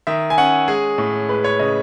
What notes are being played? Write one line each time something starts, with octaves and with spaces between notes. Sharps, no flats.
D#3 E5
G#5
C#4 F#5
G#3 G#4
A2
G#3 B4
C#5
C#3 D#5